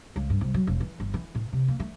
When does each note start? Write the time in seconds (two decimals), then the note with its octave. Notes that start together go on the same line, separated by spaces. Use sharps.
0.16 C#2
0.30 G2
0.41 C2
0.54 F#3
0.67 E1
0.80 E3
1.00 G1
1.14 E3
1.35 A2
1.53 C3
1.68 A#3
1.80 A3